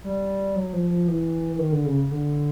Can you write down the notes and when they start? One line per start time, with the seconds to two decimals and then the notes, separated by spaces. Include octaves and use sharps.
0.04 G3
0.56 F#3
0.73 F3
0.91 F3
1.08 E3
1.52 E3
1.59 D#3
1.72 D3
1.86 C#3
2.11 D3